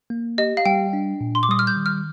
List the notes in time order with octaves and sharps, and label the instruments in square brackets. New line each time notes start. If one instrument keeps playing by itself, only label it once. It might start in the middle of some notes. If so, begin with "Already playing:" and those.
[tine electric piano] A#3
[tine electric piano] G4 [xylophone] D#5
[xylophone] F5
[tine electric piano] G3 [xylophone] G5
[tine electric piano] D4
A#2
[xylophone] C6
D6
[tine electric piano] G3 [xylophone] D#6
[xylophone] F6
G6
[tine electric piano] D#3
[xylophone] F6